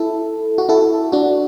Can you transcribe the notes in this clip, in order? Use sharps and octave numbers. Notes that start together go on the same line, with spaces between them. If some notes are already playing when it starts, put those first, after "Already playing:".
Already playing: E4 A4
F#4
E4 A4
D4 F#4